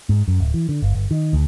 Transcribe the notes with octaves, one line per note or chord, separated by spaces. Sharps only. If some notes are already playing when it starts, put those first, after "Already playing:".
G#2
F#2
D1
E3
D3
G1
G1
D#3
D2